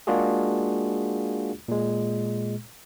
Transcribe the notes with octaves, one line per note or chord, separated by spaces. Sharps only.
G#3 A#3 D4 F4 F#4 G#4
A#2 G#3